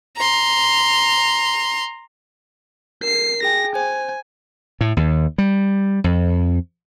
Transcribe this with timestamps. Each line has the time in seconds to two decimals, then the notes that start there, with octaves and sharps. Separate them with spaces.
0.17 A#5 C6
3.03 A#4 C7
3.43 G#4 G5 G#5 A#6
3.75 C5 G#5
4.81 A2
4.97 D#2
5.38 G3
6.04 F2